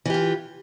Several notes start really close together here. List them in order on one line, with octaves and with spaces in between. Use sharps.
E3 G4 F4